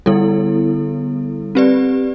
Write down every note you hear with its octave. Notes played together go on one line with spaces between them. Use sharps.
D3 G3 B3 E4 A4
C4 G4 B4 D5